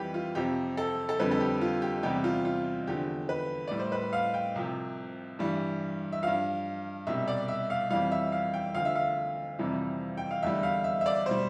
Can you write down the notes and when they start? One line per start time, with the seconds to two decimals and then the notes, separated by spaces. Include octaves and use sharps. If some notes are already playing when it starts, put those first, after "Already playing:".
Already playing: F2 E3 G3 G4 B4
0.14 F4
0.35 F2 C3 F3 G4
0.77 A4
1.09 A4
1.19 F2 D3 G3 B4
1.31 A4
1.40 G4
1.61 F4
1.82 G4
2.03 E2 C3 G3 G4
2.24 F4
2.45 F4
2.87 E2 D3 F3 G4
3.29 B4
3.67 A2 G3 D5
3.79 C5
3.92 B4
4.13 F5
4.34 G5
4.55 C2 C3 F3
5.39 G2 E3 G3
6.12 E5
6.23 G2 F3 F5
7.07 C2 B2 G3 E5
7.28 D5
7.48 E5
7.70 F5
7.91 F2 E3 G3 F5
8.12 E5
8.32 F5
8.54 G5
8.75 D2 D3 F3 F5
8.85 E5
8.96 F5
9.59 F2 C3 E3 G3
10.17 G5
10.31 F5
10.43 E2 D3 G3 E5
10.63 F5
10.84 E5
11.01 E5
11.06 D5
11.26 B2 G3 C5